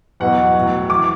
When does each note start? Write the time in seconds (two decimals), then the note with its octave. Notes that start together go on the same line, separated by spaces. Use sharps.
0.20 E2 B2 F#3 F#5
0.55 A2 F#3
0.89 E3 D6